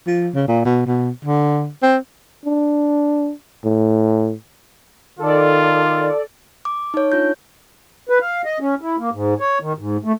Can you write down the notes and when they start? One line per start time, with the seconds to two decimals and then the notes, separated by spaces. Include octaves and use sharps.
0.07 F3
0.34 C#3
0.48 A#2
0.65 B2
0.86 B2
1.25 D3
1.82 C4
2.45 D4
3.64 A2
5.19 D#3 F4 A4 D5
6.65 D6
6.94 D#4 C#5
7.12 D4 F4 G6
8.09 B4
8.21 F5
8.45 D#5
8.60 C#4
8.81 E4
8.98 A#3
9.12 G#2
9.40 C#5
9.62 D#3
9.78 G#2
10.04 A3